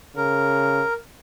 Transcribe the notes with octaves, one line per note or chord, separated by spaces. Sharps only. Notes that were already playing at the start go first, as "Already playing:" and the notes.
C#3 A#4